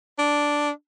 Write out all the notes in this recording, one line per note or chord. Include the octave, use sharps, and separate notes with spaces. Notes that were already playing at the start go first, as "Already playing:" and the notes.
D4